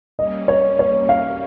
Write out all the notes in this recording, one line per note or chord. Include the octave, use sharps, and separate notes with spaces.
G3 A#3 C#4 D#5
C#5
C#5
F5